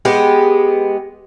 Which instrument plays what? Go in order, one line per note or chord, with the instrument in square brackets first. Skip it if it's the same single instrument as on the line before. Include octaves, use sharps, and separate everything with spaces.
[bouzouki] G#3 B3 G4